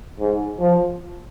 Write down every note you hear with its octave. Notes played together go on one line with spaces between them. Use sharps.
G#2
F3